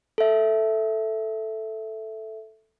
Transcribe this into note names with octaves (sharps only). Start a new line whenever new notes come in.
A4 E5